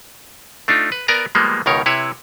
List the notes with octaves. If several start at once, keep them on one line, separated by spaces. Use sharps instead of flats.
A3 D4 D#4 F4
B4
B3 A#4 D5 G#5 A#5
F3 G3 G#3 A#3 B3
C#2 B2 D#3 A#4 C#5
C3 E4 B4 C#5